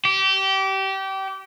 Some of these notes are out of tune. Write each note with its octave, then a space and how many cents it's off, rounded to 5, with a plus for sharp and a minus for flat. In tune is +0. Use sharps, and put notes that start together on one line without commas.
G4 -25